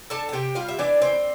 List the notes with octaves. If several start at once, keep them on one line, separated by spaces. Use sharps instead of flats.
D4 A4 A5
A5
C3 G4 G5
G3 F4 F5
E5
E3 D4 D5
C4